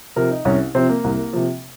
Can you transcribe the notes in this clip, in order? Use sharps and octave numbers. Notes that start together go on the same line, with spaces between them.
C3 F3 A#4
D#4
C2 C#4
C3 F3 C4
A#3
C2
C3 F3